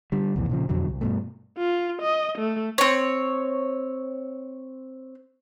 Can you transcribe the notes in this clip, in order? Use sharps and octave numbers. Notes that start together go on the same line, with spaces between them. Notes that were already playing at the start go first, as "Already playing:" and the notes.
D3 G3
C2 F2 A#2 E3
A#2 C#3 F3
F2 B2 D3 F#3
C2
G2 B2 A3
F4
D#5
A3
C4 C#5